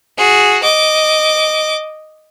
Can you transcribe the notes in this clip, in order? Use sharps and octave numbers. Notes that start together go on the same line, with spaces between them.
F#4 G#4
D#5 D6